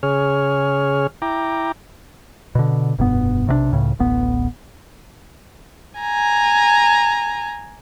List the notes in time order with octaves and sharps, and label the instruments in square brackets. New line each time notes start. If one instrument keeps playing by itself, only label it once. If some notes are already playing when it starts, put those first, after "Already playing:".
[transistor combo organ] C#3 G#4 C#5 F6
E4 G5 A#5 D6
[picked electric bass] B2 D3
F1 G2 B2 B3
B1 C3 E3 D4
C#2 A2 C#3
D1 A1 B3
[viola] G#5 A#5